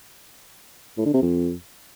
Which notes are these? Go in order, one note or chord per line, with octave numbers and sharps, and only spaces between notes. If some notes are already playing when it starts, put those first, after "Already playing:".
A2
D3
C3
F2